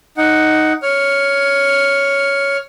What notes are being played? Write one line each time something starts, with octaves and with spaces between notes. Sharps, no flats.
D#4 F#5
C#5 F6